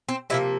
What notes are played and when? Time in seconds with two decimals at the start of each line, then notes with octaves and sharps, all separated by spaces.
0.09 C4
0.30 C3 F3 A#3 E4